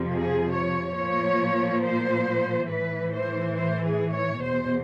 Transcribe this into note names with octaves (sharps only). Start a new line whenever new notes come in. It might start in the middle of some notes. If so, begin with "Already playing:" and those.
Already playing: F2 C3 F3
G#4
C#5
A#2 F3 C#5
C5
A2 E3 B4
C5
C5
G#4
C#5
E2 B2 C5